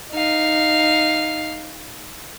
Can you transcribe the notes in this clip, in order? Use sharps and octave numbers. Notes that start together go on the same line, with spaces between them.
D#4 F5